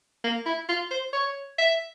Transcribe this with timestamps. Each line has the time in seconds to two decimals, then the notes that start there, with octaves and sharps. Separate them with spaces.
0.24 A#3
0.46 E4
0.69 F4
0.91 C5
1.13 C#5
1.58 E5